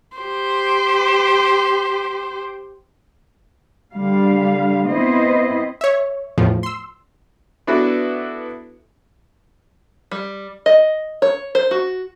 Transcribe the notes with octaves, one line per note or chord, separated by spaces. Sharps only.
G4 C5
D3 G3 F5
B3 C4 E4 C5 D#5
C#5 E5
E2 A2 F3
C6 E6
B3 D4 E4 F#4 A4 B4
G3
D#5
C#5
C5
F#4